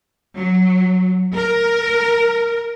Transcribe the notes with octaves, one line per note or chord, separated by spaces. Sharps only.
F#3
A#4